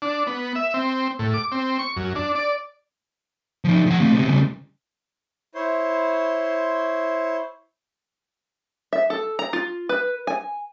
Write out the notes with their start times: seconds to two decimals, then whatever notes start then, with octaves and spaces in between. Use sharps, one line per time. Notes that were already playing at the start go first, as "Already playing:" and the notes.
0.02 D4
0.27 B3
0.55 E5
0.74 C4
1.19 A2
1.34 D6
1.52 C4
1.79 C#6
1.96 F#2
2.15 D4
2.35 D5
3.64 F3 D#4
3.86 F3 F#5
4.00 A3 C4
4.13 C3 B3
4.28 C#3 G3
5.55 E4 C5 C#5 C6
8.93 E5
9.10 A4
9.39 A#5
9.53 F4
9.89 B4
10.27 G#5